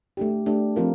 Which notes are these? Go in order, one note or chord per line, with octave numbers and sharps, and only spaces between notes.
A3 D4 G4
A3 D4 G4
F3 C4 F4 A#4